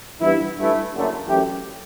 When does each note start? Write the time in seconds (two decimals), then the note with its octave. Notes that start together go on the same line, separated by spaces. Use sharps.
0.21 G2 E3 B3 E4
0.56 G2 E3 A3 E4
0.92 F#1 F#2 D3 A3
1.27 F#2 E3 A3 E4 G4